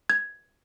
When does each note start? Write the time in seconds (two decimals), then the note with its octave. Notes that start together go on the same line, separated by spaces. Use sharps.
0.10 G#6